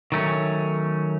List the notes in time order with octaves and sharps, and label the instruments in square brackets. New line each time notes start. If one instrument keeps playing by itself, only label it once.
[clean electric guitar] D#3 F#3 A3 C#4